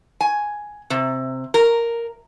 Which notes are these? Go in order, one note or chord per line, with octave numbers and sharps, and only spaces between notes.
G#5
C3
A#4